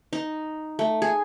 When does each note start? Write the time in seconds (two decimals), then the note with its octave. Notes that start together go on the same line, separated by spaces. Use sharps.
0.13 D#4
0.79 A3
1.02 G#4